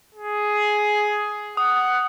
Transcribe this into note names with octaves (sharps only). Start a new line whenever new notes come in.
G#4
F#5 D#6